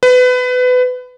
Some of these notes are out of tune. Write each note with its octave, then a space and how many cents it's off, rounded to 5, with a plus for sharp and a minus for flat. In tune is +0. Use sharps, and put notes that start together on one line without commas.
B4 +25